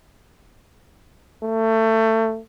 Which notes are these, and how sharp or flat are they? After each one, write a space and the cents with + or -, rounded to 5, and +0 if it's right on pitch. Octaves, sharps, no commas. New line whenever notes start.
A3 +25